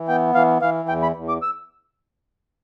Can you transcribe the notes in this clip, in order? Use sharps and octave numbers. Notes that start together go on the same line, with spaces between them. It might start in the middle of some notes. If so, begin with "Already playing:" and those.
Already playing: E3
B3 G5
E3 F5
E3 F5
E2 G5
B5
E2
D6
E6